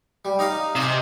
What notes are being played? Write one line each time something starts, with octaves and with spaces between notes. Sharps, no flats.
G3
D#4 D#5 F5
C3 D#5 G#5